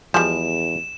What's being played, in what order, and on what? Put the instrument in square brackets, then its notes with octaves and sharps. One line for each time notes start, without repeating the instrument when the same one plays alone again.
[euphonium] E2 [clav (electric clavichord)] F3 [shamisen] G3 G#3 [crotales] E7